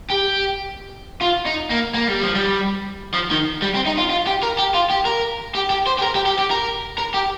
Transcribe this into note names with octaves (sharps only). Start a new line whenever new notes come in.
G4
F4
D#4
A#3
A#3
G3
F3
G3
F3
D#3
G3
C4
D#4
F4
F4
G4
A#4
G4
F4
G4
A#4
G4
G4
C5
G4
A#4
G4
G4
G4
A#4
A#4
G4